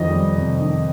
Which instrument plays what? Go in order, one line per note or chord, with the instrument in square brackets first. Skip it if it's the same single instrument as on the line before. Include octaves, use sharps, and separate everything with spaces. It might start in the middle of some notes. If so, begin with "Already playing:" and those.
Already playing: [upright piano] F2 D#3 D#5
G3
C3
D#3